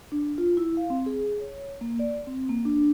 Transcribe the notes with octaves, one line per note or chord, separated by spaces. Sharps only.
D4
F4
E4
F5
C4
G#4
C#5
A#3
D5
C4
A#3
D4